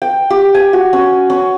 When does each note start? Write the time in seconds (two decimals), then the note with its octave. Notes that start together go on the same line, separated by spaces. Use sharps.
0.02 G5
0.30 G4
0.55 G#5
0.73 F#4
0.93 C#4
1.30 C#4